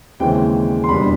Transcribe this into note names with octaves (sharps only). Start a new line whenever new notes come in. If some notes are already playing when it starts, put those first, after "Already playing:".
D#2 C#3 E3 G#3 C4 G5
C6
E2 B2 G3 A#3 D4 B5